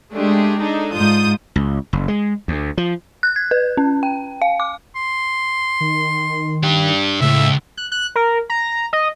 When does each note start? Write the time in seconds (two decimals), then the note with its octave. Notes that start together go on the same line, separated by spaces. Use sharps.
0.14 G#3 A3 D4 G4 G#4
0.61 D4 D#4 G#4 A4
0.94 G#2 F4 D#6 G6
1.56 C#2
1.93 F#1
2.08 G#3
2.48 D2
2.78 F3
3.23 F#6
3.36 G#6
3.51 B4
3.77 C#4
4.03 G5
4.42 F5
4.60 D6
4.96 C6
5.81 D#3
6.63 D4 G4
7.21 C#2 A2 E5
7.77 F#6
7.92 F#6
8.16 A#4
8.50 A#5
8.93 D#5